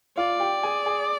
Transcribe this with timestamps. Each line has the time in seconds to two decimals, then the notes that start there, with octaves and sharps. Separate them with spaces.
0.17 F4 D5 F5
0.40 G4 G5
0.63 G#4 G#5
0.86 G#4 G#5